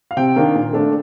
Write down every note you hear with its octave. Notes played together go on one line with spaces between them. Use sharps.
F5
C3 G5
D#3 A#3 D4
A#2
A3 D4